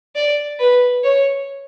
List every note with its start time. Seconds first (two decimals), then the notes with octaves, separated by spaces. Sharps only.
0.15 D5
0.60 B4
1.04 C#5